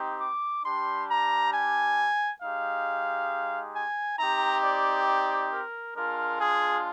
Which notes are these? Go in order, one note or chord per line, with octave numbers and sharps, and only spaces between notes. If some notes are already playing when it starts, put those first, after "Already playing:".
Already playing: C4 D#4 G4
D6
G3 D4 G4 C6
A#5
G#5
G#3 D#4 G4 F5
G#5
C4 D#4 G4 A#5
D5
D5
A#4
G#3 D4 F4 A#4
G#4